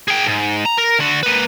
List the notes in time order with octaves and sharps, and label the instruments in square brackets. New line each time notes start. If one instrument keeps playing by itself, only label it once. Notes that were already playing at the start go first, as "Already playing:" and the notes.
[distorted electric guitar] G#4 G5
G#2
A#5
A#4
D2 F#4
A#3 B4